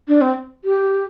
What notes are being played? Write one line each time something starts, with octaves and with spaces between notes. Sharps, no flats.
D4
C4
G4